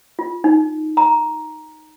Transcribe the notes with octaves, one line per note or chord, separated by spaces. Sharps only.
F4
D#4
A#5